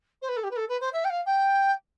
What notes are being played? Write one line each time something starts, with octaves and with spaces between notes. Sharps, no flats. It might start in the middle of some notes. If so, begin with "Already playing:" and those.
C5
B4
A4
G4
B4
A4
B4
C5
E5
G5
F5
G5